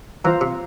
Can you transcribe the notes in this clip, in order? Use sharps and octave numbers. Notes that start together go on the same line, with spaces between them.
E3 F4 C5 F5 A#5
C3